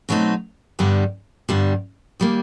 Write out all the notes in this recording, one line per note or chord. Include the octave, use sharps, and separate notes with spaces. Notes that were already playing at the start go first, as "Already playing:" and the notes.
B2 F#3 A3 C4 D#4
G2 D3 G3 B3
G2 D3 G3 B3
D#3 G3 A#3